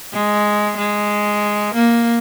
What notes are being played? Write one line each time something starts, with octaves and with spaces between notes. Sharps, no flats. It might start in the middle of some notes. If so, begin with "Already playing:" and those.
G#3
G#3
A#3